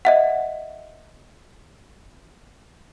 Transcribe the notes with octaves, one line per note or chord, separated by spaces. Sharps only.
D#5 E5 F#5